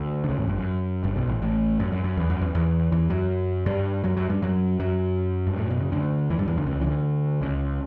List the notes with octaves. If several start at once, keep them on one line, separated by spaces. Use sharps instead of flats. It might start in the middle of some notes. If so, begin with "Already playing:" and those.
Already playing: D2
D3
C#2 C#3
A1 A2
G1 G2
F#2
G1 G2
B1 B2
A1 A2
A1 A2
F#2
F#2
F#2
E2
F#2
E2 E3
E2 E3
E2 E3
F#2 F#3
G2 G3
F#2 F#3
F#2 F#3
G2 G3
F#2 F#3
F#2 F#3
G2
A2
B2
C#3
D2 D3
E2 E3
G2 G3
E2 E3
D2 D3
C#2 C#3
E3
D2 D3
C#2 C#3